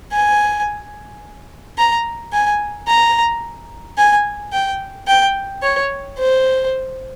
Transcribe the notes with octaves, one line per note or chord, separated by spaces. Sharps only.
G#5
A#5
G#5
A#5
G#5
G5
G5
C#5
C5